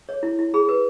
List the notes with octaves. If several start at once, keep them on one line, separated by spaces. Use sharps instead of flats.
C#5
E4
E4
G#4 B5
B4